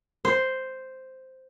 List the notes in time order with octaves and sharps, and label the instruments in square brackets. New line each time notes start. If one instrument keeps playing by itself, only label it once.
[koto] C5